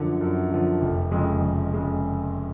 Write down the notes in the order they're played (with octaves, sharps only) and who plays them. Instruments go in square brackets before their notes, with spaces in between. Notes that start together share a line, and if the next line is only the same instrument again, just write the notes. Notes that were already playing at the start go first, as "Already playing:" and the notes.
Already playing: [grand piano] F#2 D3 F3
F#2
D3 F3
F1
F2 C#3 G#3
F1
C#3 G#3